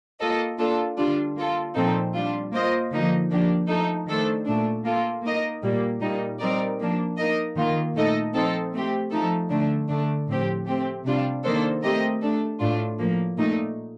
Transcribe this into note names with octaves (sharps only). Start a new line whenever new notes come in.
A#3 F4 A4 D#5
A#3 D4 F4 A4
D3 G3 D4 F4
A#3 F4 A4
A#2 F3 C4 D#4 A4
G3 D4 F4
A#3 F4 C5 D#5
D3 F3 A#3 D#4
F3 A#3 D4 G4
F3 A3 D#4 A4
D#3 A3 D4 A4 C5
A#2 A3 D4
A#3 F4 A4
A#3 D#4 A#4 D#5
A#2 G3 A#3
A#2 G3 A#3 D#4
G3 C4 D#4 A#4 D5
F3 A#3 D4
A#3 D#4 A#4 D#5
D#3 A#3 F4
A#2 A3 D#4 A4 D#5
F3 C4 D#4 A4 C5
A3 C4 G4
F3 A3 D#4 A4
D3 A3 D4
D3 A3 D4
A2 F3 C4 G4
A3 C4 G4
C3 G3 D4 F4
D#3 A#3 D4 A4 C5
A3 C4 G4 A#4 D#5
A3 D4 A4
A2 A3 D4 F4
A2 F3 A#3
A#2 A3 D#4